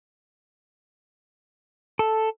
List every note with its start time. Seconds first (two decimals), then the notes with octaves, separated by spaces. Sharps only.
1.99 A4